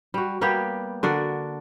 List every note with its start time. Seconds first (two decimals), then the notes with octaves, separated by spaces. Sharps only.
0.14 G3 F#4
0.41 G3 A#3 B3 G4
1.03 D3 D4 F#4 A#4